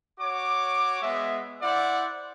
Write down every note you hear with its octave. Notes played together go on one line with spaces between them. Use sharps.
F#4 C#5 D6
G#3 B3 E5
E4 C5 D5 F#5